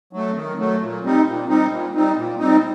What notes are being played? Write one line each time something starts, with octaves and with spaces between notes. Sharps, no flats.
F#3 A3
D#3
F#3 A3
A#2
G3 C4 D#4
A#2
G3 C4 D#4
A#2
G3 C4 D#4
A#2
G3 C4 D#4